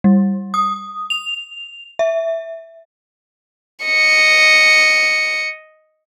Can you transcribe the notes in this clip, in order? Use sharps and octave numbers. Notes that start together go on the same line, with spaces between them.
G3
D#6
F7
E5
D#5 C#7